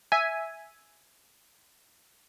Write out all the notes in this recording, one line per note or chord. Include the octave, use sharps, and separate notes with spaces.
E5 G#5